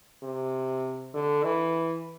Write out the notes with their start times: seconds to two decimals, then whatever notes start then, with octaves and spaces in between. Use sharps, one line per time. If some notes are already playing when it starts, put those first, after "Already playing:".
0.23 C3
1.14 D3
1.44 E3